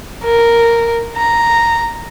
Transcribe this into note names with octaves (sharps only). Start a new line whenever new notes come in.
A#4
A#5